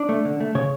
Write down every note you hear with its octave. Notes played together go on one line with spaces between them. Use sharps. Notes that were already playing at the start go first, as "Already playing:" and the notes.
Already playing: D4
A3
D3
A3
C#3 C#5